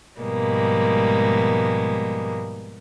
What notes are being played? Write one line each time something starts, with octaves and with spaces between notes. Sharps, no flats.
G#2 B2 F3 G3 G#3 A#3